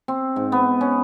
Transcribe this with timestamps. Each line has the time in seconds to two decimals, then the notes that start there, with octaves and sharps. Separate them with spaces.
0.08 C4
0.36 G#2
0.52 B3
0.81 C#4